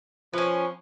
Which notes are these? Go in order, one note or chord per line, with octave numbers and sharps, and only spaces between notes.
F3 C#4 B4